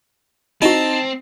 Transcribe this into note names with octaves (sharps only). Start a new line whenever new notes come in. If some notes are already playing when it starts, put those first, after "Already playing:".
C4 D#4 E4 F#4 A5